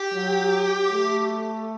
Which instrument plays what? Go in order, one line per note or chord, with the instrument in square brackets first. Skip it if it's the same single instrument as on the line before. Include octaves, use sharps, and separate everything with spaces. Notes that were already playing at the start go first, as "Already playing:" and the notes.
Already playing: [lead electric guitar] G4
[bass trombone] F#3
A3